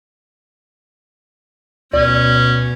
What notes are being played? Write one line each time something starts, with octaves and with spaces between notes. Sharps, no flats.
D2 B2 C#4 D5